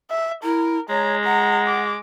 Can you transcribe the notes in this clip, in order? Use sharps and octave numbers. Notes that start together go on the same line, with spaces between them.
E5
E4 A#4
G#3 C#5 A#5
F#5 A#5
D6